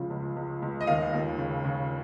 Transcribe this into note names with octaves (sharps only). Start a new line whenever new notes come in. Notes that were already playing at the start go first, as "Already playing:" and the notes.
Already playing: C#2 C#3 F3
C#2
C#2
C#2
D#5
D#2 F5
D#2
C#3
C#3